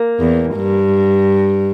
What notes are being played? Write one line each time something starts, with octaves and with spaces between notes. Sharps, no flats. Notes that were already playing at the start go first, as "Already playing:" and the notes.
Already playing: A#3
E2
G2